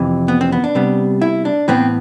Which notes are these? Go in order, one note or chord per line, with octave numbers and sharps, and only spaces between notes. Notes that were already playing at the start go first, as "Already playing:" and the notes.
Already playing: F2 C3 E3
B3
C4
B3
D4
C3 G3 B3
E4
D4
A2 E3 B3 C4